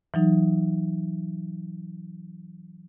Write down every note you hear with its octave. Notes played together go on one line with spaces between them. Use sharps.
E3 F#3 D#4